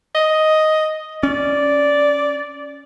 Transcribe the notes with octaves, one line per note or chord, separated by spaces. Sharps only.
D#5
C#4 D5